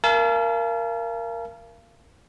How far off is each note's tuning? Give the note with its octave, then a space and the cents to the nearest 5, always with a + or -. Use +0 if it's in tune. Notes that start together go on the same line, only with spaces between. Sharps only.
A#4 +0 F5 -35 A5 -45